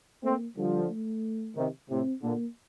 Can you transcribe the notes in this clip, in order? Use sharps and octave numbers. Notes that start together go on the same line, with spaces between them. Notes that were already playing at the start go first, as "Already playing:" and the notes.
A3 A#3 C4
D3 F3 G3
A3
C3 D#3
A2 C3 C4
A#2 D3 A#3